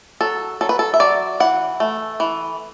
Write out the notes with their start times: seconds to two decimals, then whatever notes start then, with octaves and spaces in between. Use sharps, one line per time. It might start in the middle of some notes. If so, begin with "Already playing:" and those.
0.21 F#3 A4
0.61 F#3 A4
0.69 B4
0.79 A4
0.94 E5
1.00 F#3 D5
1.40 E3 F#5
1.80 A3
2.20 E3